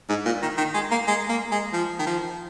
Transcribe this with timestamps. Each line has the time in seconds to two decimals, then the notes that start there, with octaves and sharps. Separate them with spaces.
0.09 G#2
0.26 A#2
0.42 D#3
0.58 D#3
0.74 G#3
0.91 A#3
1.08 G#3
1.29 A#3
1.52 G#3
1.73 F3
1.99 D#3
2.07 F3